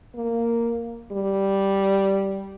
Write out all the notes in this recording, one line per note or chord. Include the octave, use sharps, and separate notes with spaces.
A#3
G3